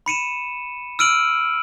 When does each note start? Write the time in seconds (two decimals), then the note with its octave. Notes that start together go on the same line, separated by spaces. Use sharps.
0.06 B5 C#7 D#7 E7
0.99 E6 F6 D7 D#7 F#7